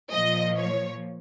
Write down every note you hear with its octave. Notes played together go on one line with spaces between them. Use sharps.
A#2 F3 D#5
C#5